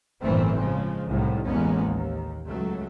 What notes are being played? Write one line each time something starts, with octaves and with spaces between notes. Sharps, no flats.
G1 A2 D#3 E3 A3 C4
C#3 F3 G#3
C2 A2 D#3
A1 E2 G#3 A#3 B3 C#4
D#2
C#2 F#3 A3